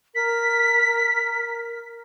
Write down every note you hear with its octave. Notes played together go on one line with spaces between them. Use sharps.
A#4 B6